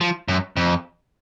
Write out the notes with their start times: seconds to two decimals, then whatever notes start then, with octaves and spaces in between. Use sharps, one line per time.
0.01 F3
0.28 F#2
0.57 F2